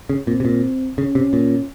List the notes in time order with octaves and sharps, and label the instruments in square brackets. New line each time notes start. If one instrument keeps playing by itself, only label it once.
[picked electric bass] C#3
[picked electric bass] A#2 [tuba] C4
[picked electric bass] C3
A#2
[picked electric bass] C#3 [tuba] C#4
[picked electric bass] C3
A#2